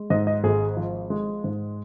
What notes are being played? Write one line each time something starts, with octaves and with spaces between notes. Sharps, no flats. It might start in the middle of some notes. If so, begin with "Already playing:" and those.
Already playing: G#3
G#2 D#5
D#5
G#1 G#4
F3
G#3
G#2